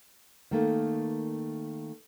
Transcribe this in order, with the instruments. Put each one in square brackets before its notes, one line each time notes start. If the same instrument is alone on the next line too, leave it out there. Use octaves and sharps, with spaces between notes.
[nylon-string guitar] D#3 A3 A#3